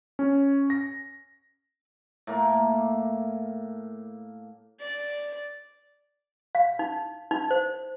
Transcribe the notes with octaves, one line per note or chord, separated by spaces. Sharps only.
C#4
A#6
A2 A#3
D5
F5
D#4
D#4
C5